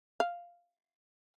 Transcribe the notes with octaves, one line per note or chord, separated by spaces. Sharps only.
F5